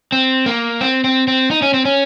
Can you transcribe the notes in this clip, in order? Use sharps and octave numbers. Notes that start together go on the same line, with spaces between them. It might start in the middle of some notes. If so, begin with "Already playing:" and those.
C4
A#3
C4
C4
C4
D#4
C#4
C4
C#4